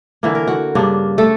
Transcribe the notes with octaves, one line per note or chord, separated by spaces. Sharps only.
D3 E3 A#3
A#4
F#4
G2 C#3 A#3 D4
A3 A4